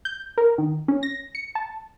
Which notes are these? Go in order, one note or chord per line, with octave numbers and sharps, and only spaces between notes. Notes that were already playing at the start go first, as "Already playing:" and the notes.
G6
A#4
D#3
C#4
A#6
C#7
A5